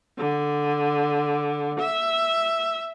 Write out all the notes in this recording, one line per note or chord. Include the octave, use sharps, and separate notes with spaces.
D3
E5